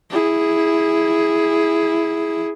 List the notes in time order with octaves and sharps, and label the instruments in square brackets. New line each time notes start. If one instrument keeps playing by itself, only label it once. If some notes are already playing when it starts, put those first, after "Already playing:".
[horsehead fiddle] E4 G#4